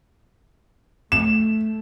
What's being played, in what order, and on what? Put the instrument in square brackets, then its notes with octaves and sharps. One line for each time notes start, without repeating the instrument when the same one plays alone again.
[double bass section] A3 [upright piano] E7